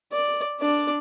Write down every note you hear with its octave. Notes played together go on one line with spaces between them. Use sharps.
D5
D4 D5